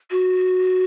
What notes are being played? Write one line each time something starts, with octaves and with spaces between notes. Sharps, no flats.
F#4